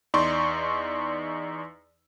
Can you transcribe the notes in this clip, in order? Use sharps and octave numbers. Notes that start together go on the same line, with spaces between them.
E2 D#4 D5 C6 C#6